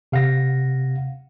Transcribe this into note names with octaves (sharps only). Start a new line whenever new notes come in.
C3 F5 F#5 A#6